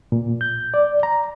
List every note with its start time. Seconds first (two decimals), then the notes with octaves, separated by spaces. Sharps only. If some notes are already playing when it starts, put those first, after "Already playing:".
0.12 A#2
0.41 G6
0.74 D5
1.03 A#5